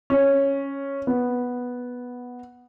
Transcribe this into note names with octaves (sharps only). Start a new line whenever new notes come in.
C#4
B3